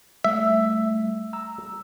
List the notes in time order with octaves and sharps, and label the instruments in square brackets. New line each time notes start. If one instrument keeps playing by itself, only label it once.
[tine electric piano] G3 A3 [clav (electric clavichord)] E5
[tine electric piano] A#5 E6